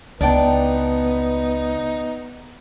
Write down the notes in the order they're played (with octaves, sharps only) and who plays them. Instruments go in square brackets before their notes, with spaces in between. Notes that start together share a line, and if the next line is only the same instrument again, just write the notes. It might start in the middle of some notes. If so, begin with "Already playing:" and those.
[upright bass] C#2 [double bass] B3 [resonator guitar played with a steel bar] D4 G5 [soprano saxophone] D#4